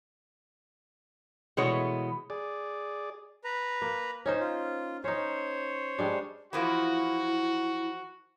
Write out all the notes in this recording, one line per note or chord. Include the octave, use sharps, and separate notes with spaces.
B2 E3 G#3 A3 B3 C#5
G#4 D5
B4 A#5
A#3
C#4 D#4 C5
F4
C#4 D#4 C5 C#5
G3 G#3 D4
E3 F3 A#3 E4 F#4